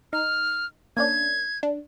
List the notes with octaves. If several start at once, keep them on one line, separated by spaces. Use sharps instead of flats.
D#4 F6
A#3 C#4 D4 G#6
D4